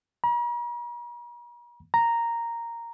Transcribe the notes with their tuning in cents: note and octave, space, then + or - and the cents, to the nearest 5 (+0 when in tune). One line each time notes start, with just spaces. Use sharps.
A#5 +45
A#5 -5